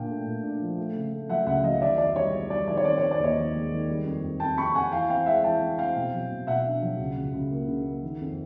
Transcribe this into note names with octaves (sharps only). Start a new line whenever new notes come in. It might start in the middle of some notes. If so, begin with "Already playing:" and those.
Already playing: A#2 D4 F5 G5
A3
A#2
D4
F3
A3
C#3
A3
F#3 E5 F#5
C#2 E5 F#5
F#3 D#5 F5
D#3 D5 E5
E2 D5
G3 C#5 D#5
E2
G3 D5
D#3 D5
C#5
C4 D5
C4 C#5
D5
D#2 C#5 D#5
D#3
G#3
D#3
G3
F2
F2
F2 G5 A5
F2 B5 C#6
F2 F#5 G#5
E3 F5 G5
C4 F5 G5
G#3 E5 F#5
E3 G5 A5
C4
C4 F5 G5
B2
F#3
B2
B2 E5 F#5
D4
F#3
C#2
C#2
C#2
A#3
C#3
A#3
D#3
F2